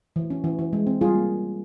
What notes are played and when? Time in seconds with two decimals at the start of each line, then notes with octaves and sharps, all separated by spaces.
0.16 E3
0.30 C#4
0.44 E3
0.59 E3
0.73 G#3
0.87 C4
1.01 G3 F4 G#4
1.15 A#3